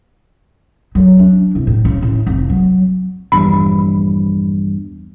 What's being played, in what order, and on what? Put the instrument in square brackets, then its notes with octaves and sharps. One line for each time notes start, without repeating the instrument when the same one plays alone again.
[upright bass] F#3
D4
C2
A2
C#3
A2
F1
F#3
[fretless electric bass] A#1 E2 G2 [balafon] B5